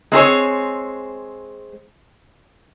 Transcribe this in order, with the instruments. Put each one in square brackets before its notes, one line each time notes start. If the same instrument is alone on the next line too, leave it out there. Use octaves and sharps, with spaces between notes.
[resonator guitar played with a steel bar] G#3 C4 G#4 C#5